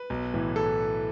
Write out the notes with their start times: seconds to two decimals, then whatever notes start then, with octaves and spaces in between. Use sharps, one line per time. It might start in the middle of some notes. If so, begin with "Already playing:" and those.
Already playing: B4
0.10 B1
0.34 A2 E3
0.56 A4